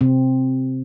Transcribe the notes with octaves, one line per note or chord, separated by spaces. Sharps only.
C3 C4